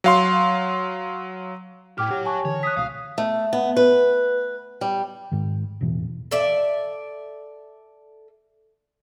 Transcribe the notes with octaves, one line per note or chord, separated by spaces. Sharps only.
F#3 F5 C6
A2 G4 G#4 G5 D6 F6
G4 C#5 F#5
G#5 A5 C#6
D3 E3 C#5
D#6 F#6 B6
C#2 B2 F5
A3
B3
B4
G3
G#2 D#3
E1 A1 B2 E3
A4 D5 E5